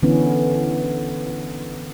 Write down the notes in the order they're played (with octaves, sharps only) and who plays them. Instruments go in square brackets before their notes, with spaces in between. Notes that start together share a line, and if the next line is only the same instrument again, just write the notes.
[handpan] D3 E3 B3 C#4